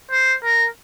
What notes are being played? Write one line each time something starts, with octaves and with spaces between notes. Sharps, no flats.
C5
A#4